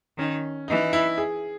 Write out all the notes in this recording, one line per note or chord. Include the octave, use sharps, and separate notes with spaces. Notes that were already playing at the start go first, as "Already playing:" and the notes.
D#3 C#4
E3 D#4
E4
G#4